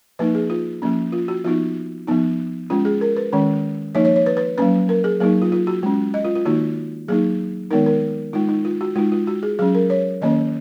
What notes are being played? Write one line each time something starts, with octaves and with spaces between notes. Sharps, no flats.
F3 A#3 D#4 B4
G#4
F4
F3 A#3 C#4
F4
F#4
F3 B3 D#4 F4
F3 B3 D#4
G#3 C#4 F4
G#4
A#4
B4
D#3 G#3 C#4
F3 A#3 D#4 C#5
C#5
C#5
B4
B4
F#3 A#3 C#4 B4
A#4
G#4
F#3 A#3 D#4 G#4
F4
F4
F#4
G#3 C#4
D#5
F4
F4
D#3 A#3 D#4 F#4
F#3 A#3 D#4 G#4
D#3 G#3 B3 D#4 A#4
A#4
G#3 D#4 F4
D#4
F4
F#4
G#3 D#4 F4
F4
F#4
G#4
F#3 C#4 G#4
A#4
C#5
D#3 A#3 C#4 D#5